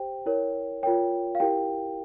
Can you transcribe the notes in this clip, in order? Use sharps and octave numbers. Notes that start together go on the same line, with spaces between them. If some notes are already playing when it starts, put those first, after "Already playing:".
Already playing: G4 C5 G5
E4 A#4 C#5
F4 A#4 C#5 G5
F5
E4 G4 A#4 G5